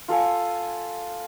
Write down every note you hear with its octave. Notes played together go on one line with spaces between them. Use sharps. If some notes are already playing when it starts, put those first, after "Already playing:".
F4 A4 F5 G#5